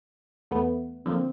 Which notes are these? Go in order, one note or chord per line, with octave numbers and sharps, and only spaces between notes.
E2 A3 B3
D3 F3 A#3 C4